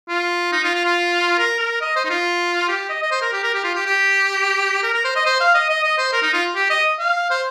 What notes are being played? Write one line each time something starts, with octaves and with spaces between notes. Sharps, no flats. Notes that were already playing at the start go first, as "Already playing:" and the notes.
F4
D#4
F4
F4
F4
A#4
A#4
D#5
C5
D#4
F4
G4
D#5
D#5
C5
A#4
G4
A#4
G4
F4
G4
G4
A#4
A#4
C5
D#5
C5
F5
D#5
D#5
D#5
C5
A#4
D#4
F4
G4
D#5
F5
C5